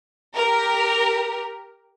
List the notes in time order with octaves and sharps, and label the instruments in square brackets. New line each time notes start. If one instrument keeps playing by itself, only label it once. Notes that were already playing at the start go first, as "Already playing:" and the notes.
[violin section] G4 A#4